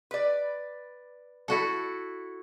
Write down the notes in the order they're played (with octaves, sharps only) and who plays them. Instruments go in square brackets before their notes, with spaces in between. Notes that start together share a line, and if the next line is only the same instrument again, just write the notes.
[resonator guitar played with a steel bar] B4 D5
[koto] E4 F#4 A4